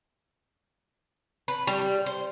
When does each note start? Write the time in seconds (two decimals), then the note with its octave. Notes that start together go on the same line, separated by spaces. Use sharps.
1.48 B4
1.67 G3
2.06 C5